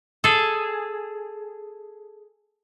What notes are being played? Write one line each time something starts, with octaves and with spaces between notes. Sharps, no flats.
G#4 A4